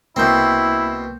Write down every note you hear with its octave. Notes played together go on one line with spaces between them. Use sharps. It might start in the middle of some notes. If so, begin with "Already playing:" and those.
C2 B2 A#3 C4 E4 G6